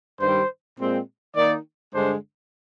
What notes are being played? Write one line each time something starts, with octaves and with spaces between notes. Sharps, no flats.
G2 D#3 G3 C5
A#2 G#3 C4
D#3 A#3 D#4 D5
G2 D3 G#3 D4 C5